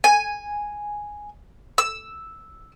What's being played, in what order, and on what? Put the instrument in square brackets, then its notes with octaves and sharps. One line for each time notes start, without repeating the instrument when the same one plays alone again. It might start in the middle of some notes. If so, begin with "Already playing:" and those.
[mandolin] G#5
E6